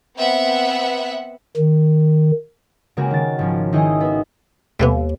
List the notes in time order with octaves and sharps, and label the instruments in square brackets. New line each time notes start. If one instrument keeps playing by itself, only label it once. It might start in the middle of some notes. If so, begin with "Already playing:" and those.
[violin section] B3 C4 E5 F#5
[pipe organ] D#3
[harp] C#3 G#3 A#3 F#4 G4
D#3 A6
G#1 F3 C#4
D#3 D#4 E4 G#4 D#5
B3 F#4
[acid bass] D#2 [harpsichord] G3 A3 B3